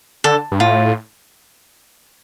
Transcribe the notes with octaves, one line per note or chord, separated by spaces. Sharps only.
D3 A4
G2
A2 F4